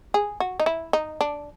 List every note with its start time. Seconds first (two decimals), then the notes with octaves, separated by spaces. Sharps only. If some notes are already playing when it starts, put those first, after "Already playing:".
0.14 G#4
0.40 F#4
0.60 D#4
0.66 E4
0.93 D#4
1.21 D4